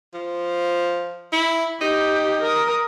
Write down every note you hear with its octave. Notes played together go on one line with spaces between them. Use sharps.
F3
E4
D#4 G4
A#4 D#6